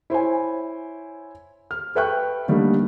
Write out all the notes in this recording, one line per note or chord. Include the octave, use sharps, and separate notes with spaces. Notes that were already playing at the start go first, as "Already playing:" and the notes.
E4 C5 C#5 G#5
F6
A4 B4 E5 G5 C#6 F#6
D3 G3 A3 A#3 D#4